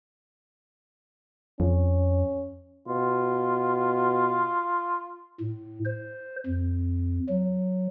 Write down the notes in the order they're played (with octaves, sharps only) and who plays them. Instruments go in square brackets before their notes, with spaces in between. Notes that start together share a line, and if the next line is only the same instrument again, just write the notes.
[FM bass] F2 [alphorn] C#4
[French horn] B2 [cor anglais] F4
[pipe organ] A2
C5
F2
F#3